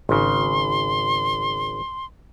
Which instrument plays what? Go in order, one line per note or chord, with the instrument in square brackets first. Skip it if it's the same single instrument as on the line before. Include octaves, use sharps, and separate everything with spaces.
[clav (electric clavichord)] G#1 C#3 [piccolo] C6